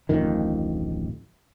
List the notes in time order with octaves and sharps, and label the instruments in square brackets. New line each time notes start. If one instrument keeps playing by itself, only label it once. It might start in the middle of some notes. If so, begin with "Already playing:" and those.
[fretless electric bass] D1 A1 F2 D#3